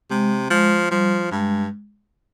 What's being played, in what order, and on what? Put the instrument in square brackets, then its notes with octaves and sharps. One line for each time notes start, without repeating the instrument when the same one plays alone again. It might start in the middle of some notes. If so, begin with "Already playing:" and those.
[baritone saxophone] C3 [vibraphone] G#3
[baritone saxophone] F3 [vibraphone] G#3
[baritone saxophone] F3 [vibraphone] G3
[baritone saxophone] G2 [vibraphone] G#3